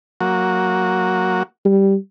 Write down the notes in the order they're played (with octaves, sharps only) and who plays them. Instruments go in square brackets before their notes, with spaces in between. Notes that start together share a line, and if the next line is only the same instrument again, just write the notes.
[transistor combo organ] F#3 A#3 F#4
[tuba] G3